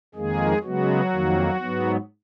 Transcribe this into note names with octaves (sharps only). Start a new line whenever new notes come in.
F2 D#3 G#3 A#3 G#4
C#3 F#3 G#3 B3 F#4
F2 D#3 A#3
G#2 F#3 B3